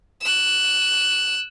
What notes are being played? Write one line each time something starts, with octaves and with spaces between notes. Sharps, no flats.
E6 F#6